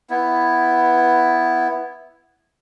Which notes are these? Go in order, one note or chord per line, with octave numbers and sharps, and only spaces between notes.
B3 E4